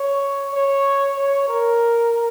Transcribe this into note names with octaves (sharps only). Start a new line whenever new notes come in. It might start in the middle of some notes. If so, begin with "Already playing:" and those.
Already playing: C#5
C#5
C#5
A#4